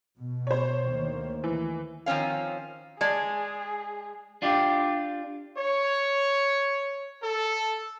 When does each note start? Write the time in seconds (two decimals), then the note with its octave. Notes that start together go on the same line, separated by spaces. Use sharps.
0.18 B2
0.47 C5 C#5
0.88 D2 D#3 A#3
1.44 E3
2.06 D#3 F3 C4 C#4 F5
3.01 G#3 G#4 D5 A5
4.42 D4 F4 G4
5.57 C#5
7.24 A4